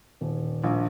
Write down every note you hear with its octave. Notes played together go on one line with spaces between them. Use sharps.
D#1
A#1